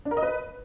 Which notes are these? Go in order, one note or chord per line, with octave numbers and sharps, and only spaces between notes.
D4
A#4
D#5
B4